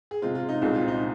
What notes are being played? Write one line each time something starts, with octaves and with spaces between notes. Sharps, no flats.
G#4
C3 G#3 C4 F4
F4
D#4
C2 A#2 G#3 C4
F4
D#4